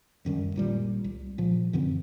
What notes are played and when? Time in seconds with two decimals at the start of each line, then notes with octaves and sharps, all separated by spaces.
0.25 D1 F#2 D#3 G3
0.56 G#1 A#2 G3
1.04 C2
1.38 A#2 F3
1.73 F#2 D3 E3 C4